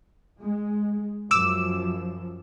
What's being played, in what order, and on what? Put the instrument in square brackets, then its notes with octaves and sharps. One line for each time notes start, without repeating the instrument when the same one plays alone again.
[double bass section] G#3
[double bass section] F#2 F3 [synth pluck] D6 E6 E7